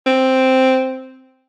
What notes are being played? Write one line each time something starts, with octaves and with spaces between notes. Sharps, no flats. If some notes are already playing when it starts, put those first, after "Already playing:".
C4